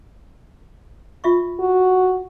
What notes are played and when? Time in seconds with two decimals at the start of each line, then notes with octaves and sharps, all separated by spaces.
1.24 F4 E5 C#6
1.59 F#4